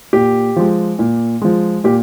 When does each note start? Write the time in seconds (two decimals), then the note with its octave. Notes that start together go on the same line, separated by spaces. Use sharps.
0.13 A#2 G4
0.56 F3 G#3
0.99 A#2
1.42 F3 G#3
1.84 A#2 G4